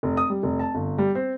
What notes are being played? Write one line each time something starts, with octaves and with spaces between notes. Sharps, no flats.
F1
D#6
G3
F1
A5
G1
G3
C4